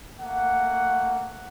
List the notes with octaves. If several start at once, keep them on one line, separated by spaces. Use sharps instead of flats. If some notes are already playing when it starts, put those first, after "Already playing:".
A3 A#3 F#5